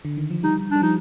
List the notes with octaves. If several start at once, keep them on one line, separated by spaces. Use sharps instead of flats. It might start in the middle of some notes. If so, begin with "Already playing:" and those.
D3
D#3
F3
G3 D#4
G3 D4
F3 D#4